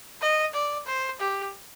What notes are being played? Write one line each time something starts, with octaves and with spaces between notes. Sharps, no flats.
D#5
D5
C5
G4